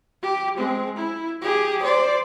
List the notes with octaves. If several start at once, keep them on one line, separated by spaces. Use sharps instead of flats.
G4
G#3 C4
E4
G4 G#4
C5 D5